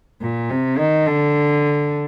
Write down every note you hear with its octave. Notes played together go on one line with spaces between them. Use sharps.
A#2
C3
D#3
D3